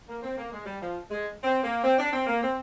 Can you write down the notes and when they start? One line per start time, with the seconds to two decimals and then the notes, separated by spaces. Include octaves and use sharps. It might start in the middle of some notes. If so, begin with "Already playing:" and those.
0.07 A#3
0.22 C4
0.37 A#3
0.51 G#3
0.65 G3
0.81 F3
1.10 G#3
1.44 C4
1.63 A#3
1.83 C4
1.98 D4
2.13 C4
2.27 A#3
2.41 C4